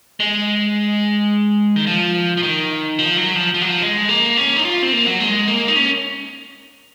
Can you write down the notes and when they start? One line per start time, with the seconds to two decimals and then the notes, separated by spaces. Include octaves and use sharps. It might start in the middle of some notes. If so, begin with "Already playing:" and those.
0.20 G#3
1.76 D#3
1.87 F3
2.37 F3
2.43 D#3
2.99 F3
3.17 F#3
3.36 F3
3.54 F3
3.62 F#3
3.69 F3
3.82 G#3
4.09 A#3
4.37 C#4
4.56 D#4
4.65 F4
4.83 C4
4.93 A#3
5.06 F#3
5.20 G#3
5.48 A#3
5.68 D#4
5.76 C#4